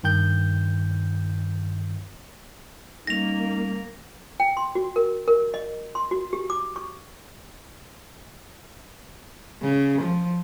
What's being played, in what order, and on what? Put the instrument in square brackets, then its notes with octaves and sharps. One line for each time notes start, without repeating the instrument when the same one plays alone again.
[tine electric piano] G2 D#3 G5 G6
[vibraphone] G3 C#4 [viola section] A#3 [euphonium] D#4 [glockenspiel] A#6 F7
[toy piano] G5
C6
F#4
A#4
A#4
D#5
C6
F#4
G4
D6
C#6
[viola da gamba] C#3
F3